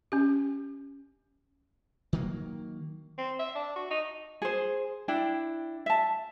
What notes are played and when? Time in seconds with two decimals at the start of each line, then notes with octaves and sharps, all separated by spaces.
0.12 C#4 G4
2.13 D#3 F#3 A#3
3.18 C4
3.39 E5
3.55 D4
3.76 F#4
3.90 D#4
4.42 G#4 C5
5.08 D4 E4 G5
5.86 E5 A5